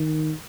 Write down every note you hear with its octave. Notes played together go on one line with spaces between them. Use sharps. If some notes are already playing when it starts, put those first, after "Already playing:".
Already playing: D#3